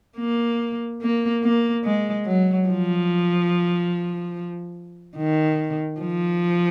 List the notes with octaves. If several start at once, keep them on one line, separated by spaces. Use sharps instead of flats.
A#3
A#3
A#3
G#3
F#3
F3
D#3
F3